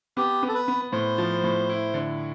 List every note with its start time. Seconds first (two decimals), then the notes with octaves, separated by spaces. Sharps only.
0.17 B3 G4
0.43 B3
0.49 A4
0.54 B4
0.68 B3
0.92 A2 C5
1.18 F3
1.44 A2
1.69 E4
1.94 D3